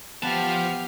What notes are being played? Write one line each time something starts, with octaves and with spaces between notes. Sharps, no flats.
F3 B3 G4 F5 A5